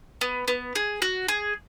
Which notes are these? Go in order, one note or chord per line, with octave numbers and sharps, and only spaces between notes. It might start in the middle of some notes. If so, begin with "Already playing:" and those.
B3
B3
G#4
F#4
G#4